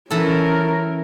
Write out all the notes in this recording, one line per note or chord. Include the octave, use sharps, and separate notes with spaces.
E3 C#4 A4 A#4